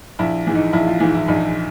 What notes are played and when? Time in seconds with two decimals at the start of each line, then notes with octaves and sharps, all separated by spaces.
0.19 A#1 E4
0.47 G#2 E3
0.55 D#4
0.73 A#1 E4
0.87 F4
1.00 G#2 E3
1.14 E4
1.28 A#1 D#4